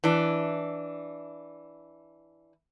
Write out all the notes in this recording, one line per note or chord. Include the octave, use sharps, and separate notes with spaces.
E3 D4